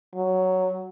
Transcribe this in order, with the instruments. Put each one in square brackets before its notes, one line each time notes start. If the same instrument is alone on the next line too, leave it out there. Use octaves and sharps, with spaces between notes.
[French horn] F#3